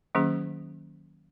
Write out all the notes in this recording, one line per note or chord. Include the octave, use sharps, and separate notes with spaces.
D#3 F#3 A#3 C#4 G#4